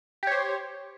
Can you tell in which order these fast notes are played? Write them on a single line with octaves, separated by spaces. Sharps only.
G4 C#5 C5